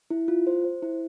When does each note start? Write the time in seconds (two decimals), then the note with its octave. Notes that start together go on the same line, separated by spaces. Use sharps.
0.10 E4
0.28 F4
0.47 C5
0.64 C5
0.83 E4